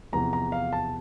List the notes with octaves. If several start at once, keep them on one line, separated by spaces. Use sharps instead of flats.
E2 C3 F3 A#5
A#5
F5
A5